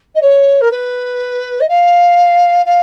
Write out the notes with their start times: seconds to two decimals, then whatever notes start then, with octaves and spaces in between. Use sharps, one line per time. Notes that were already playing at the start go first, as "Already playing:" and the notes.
0.14 D#5
0.21 C#5
0.60 A#4
0.71 B4
1.60 D#5
1.68 F5
2.65 F5